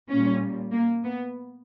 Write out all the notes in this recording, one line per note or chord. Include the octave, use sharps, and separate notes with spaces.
A#2 G3 C#4
A#3
B3